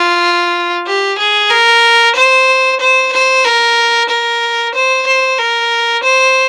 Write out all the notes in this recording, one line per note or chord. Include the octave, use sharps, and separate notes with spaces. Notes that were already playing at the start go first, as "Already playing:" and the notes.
Already playing: F4
G4
G#4
A#4
C5
C5
C5
A#4
A#4
C5
C5
A#4
C5